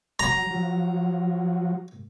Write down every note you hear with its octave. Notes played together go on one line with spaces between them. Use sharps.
F#3 A#5
F3 F#3